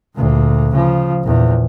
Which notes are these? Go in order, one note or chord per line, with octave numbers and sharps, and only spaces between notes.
D2 A#2
C#3 F3
A#1 E2